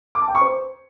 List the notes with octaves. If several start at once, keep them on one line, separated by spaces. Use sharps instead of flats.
D6
A5
G5
C#6
C5